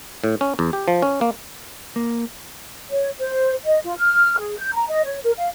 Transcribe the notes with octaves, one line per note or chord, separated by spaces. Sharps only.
A2
C#4
E2
G4
F3
C#4
A#3
A#3
C#5
C5
D#5
F4
F6
G#4
G6
A#5
D#5
C#5
A#4
F5